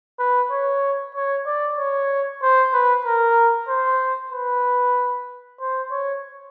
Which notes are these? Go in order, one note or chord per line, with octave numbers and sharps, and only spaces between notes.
B4
C#5
C#5
D5
C#5
C5
B4
A#4
C5
B4
C5
C#5